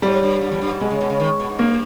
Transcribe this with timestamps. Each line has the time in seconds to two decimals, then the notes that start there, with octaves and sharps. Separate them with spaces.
0.02 G#2 G3
0.23 G2
0.41 G2
0.51 E2
0.61 G2
0.71 G#2
0.80 B2 G#3
0.90 C#3
1.01 B2
1.10 C#3
1.20 D#3
1.40 B2
1.49 G#2
1.59 G2 A#3